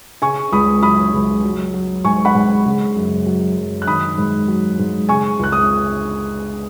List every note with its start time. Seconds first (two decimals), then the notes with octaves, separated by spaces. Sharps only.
0.22 C#3 G#5 C#6
0.52 C#2 B5 D#6
0.83 F#3 B5 D#6
1.13 C#2
1.43 F#3
1.74 F#3
2.05 G#2 G#5 C#6
2.25 F#5 B5
2.35 G#2
2.66 C#3
2.96 F#2
3.26 F#3
3.57 F#2
3.82 F#6
3.87 D#3 B5 D#6
4.18 G#2
4.48 F#3
4.79 G#2
5.09 C#3 G#5 C#6
5.39 C#2 F#6
5.52 D#6